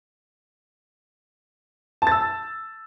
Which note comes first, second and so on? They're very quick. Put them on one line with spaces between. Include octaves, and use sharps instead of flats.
A5 A6 E6